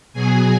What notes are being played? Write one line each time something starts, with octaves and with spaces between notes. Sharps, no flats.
B2 F#3 G#4 G#5